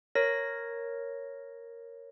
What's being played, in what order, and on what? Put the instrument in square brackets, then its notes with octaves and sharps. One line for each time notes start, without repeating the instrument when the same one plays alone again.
[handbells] A#4 C#5 A#6